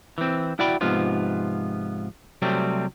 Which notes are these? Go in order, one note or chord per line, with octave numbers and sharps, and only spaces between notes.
E3 C4
E4 F#4 D5 G5 B5
G#2 C3 F3 B3 F4
C3 F#3 G3 A3 C4